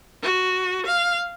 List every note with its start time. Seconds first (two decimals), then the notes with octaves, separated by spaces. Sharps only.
0.23 F#4
0.86 F5